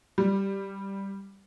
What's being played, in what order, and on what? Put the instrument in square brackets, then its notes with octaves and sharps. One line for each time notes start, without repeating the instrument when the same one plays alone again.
[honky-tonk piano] G3